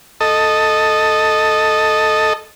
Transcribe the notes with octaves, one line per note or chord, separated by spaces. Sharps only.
A4 D#5